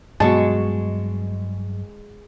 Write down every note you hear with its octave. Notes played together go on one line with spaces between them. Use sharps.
G2 B2 F#3 G#3 A5 C#6